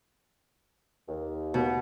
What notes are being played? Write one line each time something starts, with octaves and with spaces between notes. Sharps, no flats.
D#2
B2